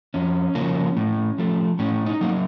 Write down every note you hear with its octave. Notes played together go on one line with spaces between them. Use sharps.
F2 C#4
C#3 F3 A#3
A2
F3 A3
A2 C#4
D#4
F#3 A#3